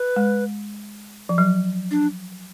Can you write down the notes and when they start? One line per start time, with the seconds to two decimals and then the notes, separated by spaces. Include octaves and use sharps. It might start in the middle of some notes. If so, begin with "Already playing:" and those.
Already playing: B4
0.16 G#3
1.29 F3
1.38 F#3
1.91 D4